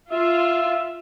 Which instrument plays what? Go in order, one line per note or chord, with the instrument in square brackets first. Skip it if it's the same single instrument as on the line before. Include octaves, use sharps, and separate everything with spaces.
[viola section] F4 [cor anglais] E5